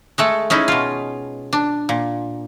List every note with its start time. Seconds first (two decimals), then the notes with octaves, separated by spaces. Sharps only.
0.18 G#3 A3 A4
0.50 G#3 C#4 D#4 E4
0.68 B2 F4
1.53 D4
1.89 A#2